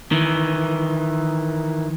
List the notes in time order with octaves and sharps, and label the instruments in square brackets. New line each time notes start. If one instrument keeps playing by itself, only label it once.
[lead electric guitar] D#3 E3